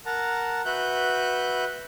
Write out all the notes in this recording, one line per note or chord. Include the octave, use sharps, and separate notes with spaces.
A#4 F#5 A5 A#5
F#4 B4 E5 F#6 G6